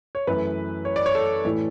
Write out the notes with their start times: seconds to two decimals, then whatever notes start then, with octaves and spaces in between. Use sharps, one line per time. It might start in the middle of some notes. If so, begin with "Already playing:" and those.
0.15 C#5
0.27 F#2 E3 A3 B4
0.85 C#5
0.96 D5
1.06 C#5
1.15 A4
1.45 A2 E3 A3